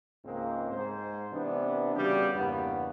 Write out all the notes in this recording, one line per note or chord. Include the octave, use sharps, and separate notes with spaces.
C#2 G#2 G#3 A#3 C4
G#2 C5
C3 E3 B3 D4
C#3 G3 B3 F#4 G4
E2 G2 C#3 A#3 B3